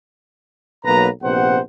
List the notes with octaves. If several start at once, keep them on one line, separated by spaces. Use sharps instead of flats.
B1 F#3 A#3 B4 A#5
A#1 C3 B3 C5 F#5